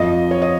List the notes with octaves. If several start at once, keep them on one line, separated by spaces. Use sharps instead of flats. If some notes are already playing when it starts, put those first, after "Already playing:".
Already playing: F2 F3 D#5
C#5
D#5